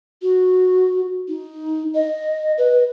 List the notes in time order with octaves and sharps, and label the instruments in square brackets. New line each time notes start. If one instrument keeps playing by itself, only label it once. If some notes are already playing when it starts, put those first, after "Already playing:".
[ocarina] F#4
D#4
D#5
B4